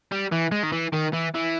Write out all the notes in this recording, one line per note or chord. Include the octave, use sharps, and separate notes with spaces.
G3
E3
G#3
D#3
E3
D#3
E3
E3